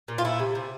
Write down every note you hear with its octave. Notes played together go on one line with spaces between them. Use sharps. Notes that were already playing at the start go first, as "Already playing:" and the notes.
A#2
F4
A3 E4
C3
C3